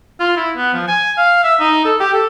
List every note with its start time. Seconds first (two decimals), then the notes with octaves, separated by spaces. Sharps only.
0.20 F4
0.36 E4
0.56 B3
0.73 F3
0.88 G#5
1.17 F5
1.43 E5
1.60 D#4
1.85 A4
2.00 G4
2.14 A4